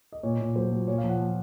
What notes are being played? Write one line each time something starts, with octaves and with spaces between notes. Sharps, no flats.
D#5
A#2 C#5
A#2
F#3 C5
F#3
A#2 C#5
F5
F3
F#5
F3